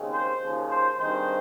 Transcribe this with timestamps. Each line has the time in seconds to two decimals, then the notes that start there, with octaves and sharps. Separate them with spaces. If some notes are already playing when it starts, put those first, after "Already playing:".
Already playing: D#2 C#3 G#3 C4
0.11 C5
0.41 D#2 C#3 F3
0.70 C5
0.98 G2 D#3 G#3 C4 C5